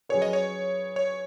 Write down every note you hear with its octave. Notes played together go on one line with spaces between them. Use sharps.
F#3 C#4 G#4 B4 C#5
D#5
C#5
C#5